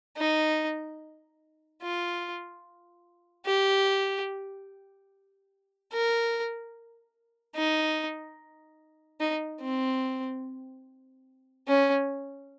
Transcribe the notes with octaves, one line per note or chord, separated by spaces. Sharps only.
D#4
F4
G4
A#4
D#4
D#4
C4
C#4